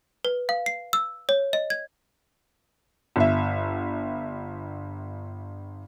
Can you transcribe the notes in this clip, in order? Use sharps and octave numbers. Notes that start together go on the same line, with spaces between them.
B4
F5
C7
E6
C#5
D#5
G#6
G1 E5